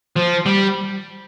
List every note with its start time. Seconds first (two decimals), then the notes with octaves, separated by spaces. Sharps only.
0.16 F3
0.46 G3